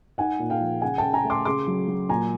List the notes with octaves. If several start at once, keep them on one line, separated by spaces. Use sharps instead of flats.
D#4 F#5 G#5
A#2
F5 G5
F3
C#3 F#5 G#5
C#3 G5 A5
G#5 A#5
A3
C6 D6
C#3 C6 D6
F#3
F#3
A#2 G#5 A#5